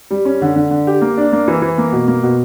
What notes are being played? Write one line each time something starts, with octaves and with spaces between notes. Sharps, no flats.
G3
C#4
D3
D3
D3
G4
A#3
D4
A#3
E3
E3
A#3
B2
A#3
B2